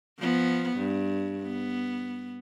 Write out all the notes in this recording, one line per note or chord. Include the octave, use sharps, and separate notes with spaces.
F3 B3
G2
B3